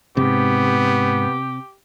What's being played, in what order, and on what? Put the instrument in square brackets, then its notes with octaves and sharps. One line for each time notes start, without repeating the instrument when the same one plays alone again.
[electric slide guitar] F2 G#2 [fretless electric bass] C3 [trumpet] B3 [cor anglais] G4